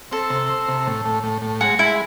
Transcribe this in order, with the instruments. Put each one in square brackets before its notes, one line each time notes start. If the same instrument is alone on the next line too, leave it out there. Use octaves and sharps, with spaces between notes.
[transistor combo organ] C4 [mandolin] A4
[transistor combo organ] C3
C4
C3
A2
A2
A2
A2
[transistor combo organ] G#3 [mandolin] F#4
[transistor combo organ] G#3 [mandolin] E4